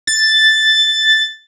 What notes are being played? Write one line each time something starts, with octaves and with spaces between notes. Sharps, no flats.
A6